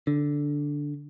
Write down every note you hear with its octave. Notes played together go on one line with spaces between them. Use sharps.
D3